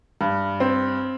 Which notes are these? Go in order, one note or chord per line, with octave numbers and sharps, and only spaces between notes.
G2
C4